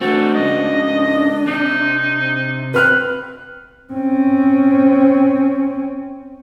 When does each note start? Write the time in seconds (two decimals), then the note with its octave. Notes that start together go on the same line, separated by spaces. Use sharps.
0.01 A3 C4 D4 F#4 A4
0.35 G#2 C#3 D#5
1.48 C3 D#4
2.74 C4 B4 F6 F#6
3.93 C4 C#4